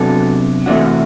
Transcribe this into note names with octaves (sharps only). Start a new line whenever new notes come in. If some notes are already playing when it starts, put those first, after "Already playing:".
Already playing: C3 F#3 B3 D4 F#4 A4
C3 E3 A3 C4 D4 F#4